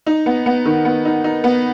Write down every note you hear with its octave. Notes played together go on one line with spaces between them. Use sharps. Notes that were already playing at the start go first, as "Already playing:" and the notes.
D#4
B3
B3
D#3
B3
D#4
D#4
B3